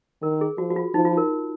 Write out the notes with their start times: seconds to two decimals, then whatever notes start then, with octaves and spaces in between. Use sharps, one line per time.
0.22 D#3 A#4
0.41 G#4
0.58 F3 F#4
0.70 F#4
0.76 F4
0.94 F3 D#4
1.05 F4
1.17 A#4